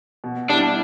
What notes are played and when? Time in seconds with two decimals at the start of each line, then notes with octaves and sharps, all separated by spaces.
0.24 B2
0.50 G3 D4 E4